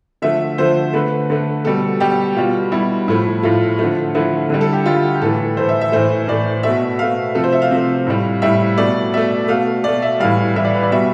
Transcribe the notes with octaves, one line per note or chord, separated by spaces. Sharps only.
D3 F3 A3 E5
D3 F3 A3 C5
D3 A3 B4
D3 A3
B2 G3 A4
B2 G3 G4
B2 G3 F4
B2 G3 E4
A2 F3 A3 E4
A2 F3 A3 F4
D3 F3 A3
D3 F3 A3 E4
D3 G3
A4
G4
D3 G3 F4
G4
A2 E3 A3 A4
A2 E3 A3 C5
E5
E5
A2 E3 A3 C5
A2 E3 A3 D5
B2 A3 E5
B2 A3 F5
C3 F3 A3 A4
C5
E5
F5
C3 F3 A3
A2 G3
A2 G3 E5
B2 A3 D5
B2 A3 E5
B2 A3 F5
B2 A3 D5
E5
A2 E3 G3 F5
A2 E3 G3 E5
D5
B4
D5
B2 G3 E5